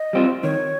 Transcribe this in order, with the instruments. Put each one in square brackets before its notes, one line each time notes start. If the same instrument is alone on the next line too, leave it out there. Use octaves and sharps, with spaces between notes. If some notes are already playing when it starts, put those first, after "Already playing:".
Already playing: [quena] D#5
[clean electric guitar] G3 C4 F4
[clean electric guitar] D#3 [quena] C#5